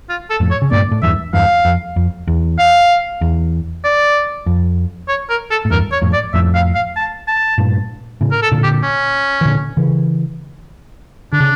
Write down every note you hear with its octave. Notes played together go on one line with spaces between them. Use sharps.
F4
A4
F2 A2
C#5
C#3
G2 A#2 D5
A2
E2 G2 E5
E2 G2 F5
F2
F2
E2
F5
E2
D5
F2
C#5
A#4
A4
A2
E2 G2 A#4
C#5
F2 A2
D5
F2 A2 E5
F5
F5
A5
A5
G2 A#2
A2 C#3
A#4
A4
A#2 D3
G4
C#4
E3
A#2 D3
C#3 E3
D3 D4
C#3